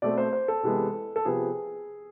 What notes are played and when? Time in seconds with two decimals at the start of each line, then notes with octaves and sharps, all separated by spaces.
0.02 B2 A3 C4 D5
0.18 C5
0.33 C5
0.48 A4
0.63 C3 E3 G#3 B3
1.16 A4
1.25 C3 F3 B3 G#4